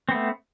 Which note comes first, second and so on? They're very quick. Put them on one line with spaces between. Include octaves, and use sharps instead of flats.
C4 B3 A3